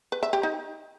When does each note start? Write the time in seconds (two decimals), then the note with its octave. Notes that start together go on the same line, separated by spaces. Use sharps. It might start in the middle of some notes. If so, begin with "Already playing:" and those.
0.12 B4
0.23 E5
0.33 G4
0.43 D#4